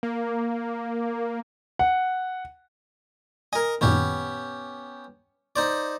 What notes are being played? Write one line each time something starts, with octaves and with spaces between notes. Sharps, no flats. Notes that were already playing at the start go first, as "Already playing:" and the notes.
A#3
F#5
A#4 D#5 G#5
F#2 A#2 D#3 B3 C#4 G4
D#4 C5 D5